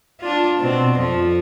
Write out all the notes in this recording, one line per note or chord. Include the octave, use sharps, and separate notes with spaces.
D4 F4
B2 C4
F2 F3